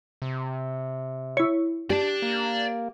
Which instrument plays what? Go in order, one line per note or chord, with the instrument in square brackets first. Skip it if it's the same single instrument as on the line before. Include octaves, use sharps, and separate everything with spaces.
[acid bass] C3
[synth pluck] E4 C#5
[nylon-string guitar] G4 [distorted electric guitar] D5 A5
[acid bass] A#3